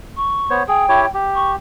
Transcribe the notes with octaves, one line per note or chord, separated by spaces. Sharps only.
C#6
B3 C5 C#5
G#4 G5
E4 G4 C#5
G4
C#6